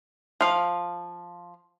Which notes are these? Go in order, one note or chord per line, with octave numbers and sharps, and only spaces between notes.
F3 F5